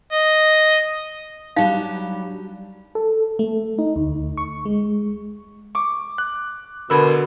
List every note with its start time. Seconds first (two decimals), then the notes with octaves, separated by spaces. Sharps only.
0.13 D#5
1.56 F#3 G3 D4 D#4 F5
2.95 A4
3.39 A3
3.79 D#4
3.96 D2
4.37 C#6
4.65 G#3
5.75 C#6 D6
6.18 F#6
6.90 B2 D3 A#4 B5 E6 G#6